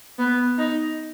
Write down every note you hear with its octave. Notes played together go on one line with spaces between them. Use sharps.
B3
D#4